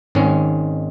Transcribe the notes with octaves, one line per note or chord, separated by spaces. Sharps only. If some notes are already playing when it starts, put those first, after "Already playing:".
G#1 G#2 D#3 G#3 C#4